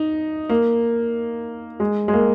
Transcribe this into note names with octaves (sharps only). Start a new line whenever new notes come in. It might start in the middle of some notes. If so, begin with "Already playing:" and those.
Already playing: D#4
A#3
G#3
G#3
A#3